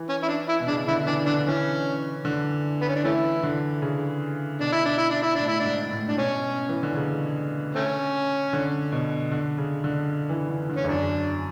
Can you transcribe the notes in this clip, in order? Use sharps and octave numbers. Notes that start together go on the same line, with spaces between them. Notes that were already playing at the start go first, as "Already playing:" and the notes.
Already playing: E3
C#4
E4
D4
E4
B2
C#3 D4
D3 E4
E3 D4
D3 D4
E3 C#4
D3
B3
C#4
D4
E3 A3 C#4 E4
D3
C#3
B2 D4
E4
D4
E4
D4
E4
A2 D4
E4
G#2 D4
A2
D4
B2 C#4
E3
D3
C#3
A3 C#4
D3
B2
D3
C#3
D3
E3
D3
D3
C#4
E2
F#2 D4